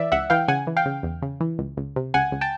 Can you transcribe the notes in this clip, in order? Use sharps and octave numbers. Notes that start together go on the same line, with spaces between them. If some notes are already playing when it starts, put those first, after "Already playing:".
Already playing: E3 D5 E5
C#2 E5 F#5
E3 F5 G5
C#3 F#5 G#5
E3
F5 G5
C#3
E2
C#3
E3
C#2
C#2
C3
C#2 F#5 G#5
C#2
G5 A5